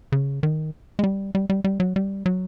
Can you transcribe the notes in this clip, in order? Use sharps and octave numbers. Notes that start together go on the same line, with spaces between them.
C#3
D#3
G#3
G3
G3
G3
G3
F#3
G3
F#3